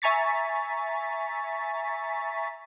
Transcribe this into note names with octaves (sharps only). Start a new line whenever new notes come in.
E5 G#5 A#5 C#6 A6 B6